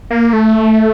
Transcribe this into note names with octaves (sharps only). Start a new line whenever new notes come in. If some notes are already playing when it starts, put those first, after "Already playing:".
A#3
A3